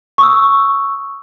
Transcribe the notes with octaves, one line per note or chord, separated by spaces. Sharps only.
C#6 D#6 E6